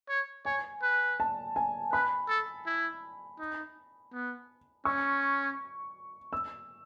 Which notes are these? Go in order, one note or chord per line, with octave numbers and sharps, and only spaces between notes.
C#5
C#5 G#5
B4
A5
G#5
B4 B5
A4
E4
D#4
B3
C#4 C#6
E6